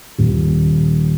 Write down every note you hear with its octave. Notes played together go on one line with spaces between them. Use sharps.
D#1